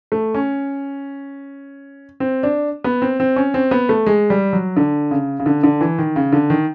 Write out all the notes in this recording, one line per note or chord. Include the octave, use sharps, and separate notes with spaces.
A3
C#4
C4
D4
B3
C4
C4
C#4
C4
B3
A3
G#3
G3
F#3
D3
C#3
C#3
D3
D3
E3
D#3
C#3
D3
D#3